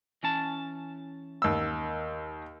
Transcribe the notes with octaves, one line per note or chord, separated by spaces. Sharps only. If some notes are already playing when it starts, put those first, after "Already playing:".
E3 C#4 A5
D#2 E6